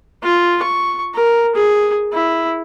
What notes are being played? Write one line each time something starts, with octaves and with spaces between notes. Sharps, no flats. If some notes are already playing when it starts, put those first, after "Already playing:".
F4
C#6
A#4
G#4
E4